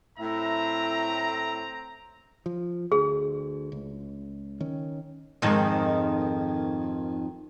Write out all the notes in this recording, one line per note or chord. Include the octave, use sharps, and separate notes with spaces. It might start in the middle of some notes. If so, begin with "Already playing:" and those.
A2 C4 E5 A#5
F3
D2 G#4
C#2
D#3 C#4
F2 G#2 D#3